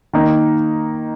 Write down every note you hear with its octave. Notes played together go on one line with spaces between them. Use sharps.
D#3 A#3 D#4